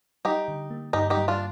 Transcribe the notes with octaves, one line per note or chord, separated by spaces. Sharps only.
G3 D#4 G4
D3
A#3
G2 D#4 G4
D#4 G4
G3
D4 F4